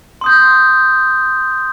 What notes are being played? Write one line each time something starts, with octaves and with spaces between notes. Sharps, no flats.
C6 D#6 G6